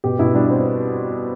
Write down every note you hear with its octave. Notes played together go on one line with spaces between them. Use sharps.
B2 G4
B2 E4
G3 D4
C4